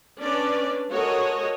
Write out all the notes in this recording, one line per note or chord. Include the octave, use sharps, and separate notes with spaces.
C#4 D4 B4 D5
G#3 F#4 A4 A#4 C#5 D#5